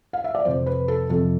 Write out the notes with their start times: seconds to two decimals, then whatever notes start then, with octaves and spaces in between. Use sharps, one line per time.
0.13 F5
0.24 E5
0.35 D5
0.45 F2 C3 F3 C5
0.66 B4
0.88 A4
1.10 F2 C3 F3 A4